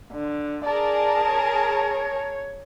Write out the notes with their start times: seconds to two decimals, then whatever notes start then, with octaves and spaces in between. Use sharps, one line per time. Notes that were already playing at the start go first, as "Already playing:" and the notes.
0.12 D3
0.65 G#4 A#4 D5 A5
1.32 C#5